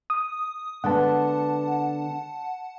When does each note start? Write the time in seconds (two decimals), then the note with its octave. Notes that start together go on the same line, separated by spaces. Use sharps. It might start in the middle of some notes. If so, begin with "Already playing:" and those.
0.10 D#6
0.84 D3 G#3 B3 F#5 A5